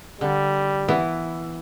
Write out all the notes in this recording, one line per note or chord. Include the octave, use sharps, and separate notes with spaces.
D3 G3
E3 B3 E4